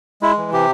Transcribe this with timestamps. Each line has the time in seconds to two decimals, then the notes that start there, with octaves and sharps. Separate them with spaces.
0.22 G#3 E4
0.38 E3
0.52 C3 G4